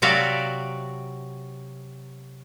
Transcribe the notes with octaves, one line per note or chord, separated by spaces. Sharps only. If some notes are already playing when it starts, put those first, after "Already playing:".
C3 F#3 F#4 D5 E5 F5